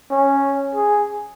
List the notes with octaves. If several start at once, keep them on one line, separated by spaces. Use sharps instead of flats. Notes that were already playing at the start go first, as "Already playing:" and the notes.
C#4
G#4